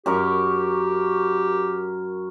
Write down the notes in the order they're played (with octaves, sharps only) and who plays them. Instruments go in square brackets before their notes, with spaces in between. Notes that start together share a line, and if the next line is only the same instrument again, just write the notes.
[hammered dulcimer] F#2 A#4 C#6 [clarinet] G4